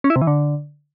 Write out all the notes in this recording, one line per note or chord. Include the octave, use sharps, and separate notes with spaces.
C#4
E4
C3
E3
D3